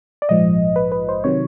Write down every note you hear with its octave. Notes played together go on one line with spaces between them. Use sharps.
D5
A#1 G#2 F3 D#5
B4
B4
C5
C3 D#3 F#3 C#5